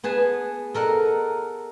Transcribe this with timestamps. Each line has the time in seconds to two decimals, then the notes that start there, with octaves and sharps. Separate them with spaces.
0.04 B3 G#4 B4 A5
0.74 A4 A#4 D#5 F#5